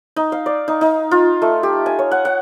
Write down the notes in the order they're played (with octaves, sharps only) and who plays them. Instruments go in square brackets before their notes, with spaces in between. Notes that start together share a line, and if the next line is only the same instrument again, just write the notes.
[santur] D#4
F5
D5
D#4
D#4
F4
A3
G4
G#5
C#5
F#5
F#5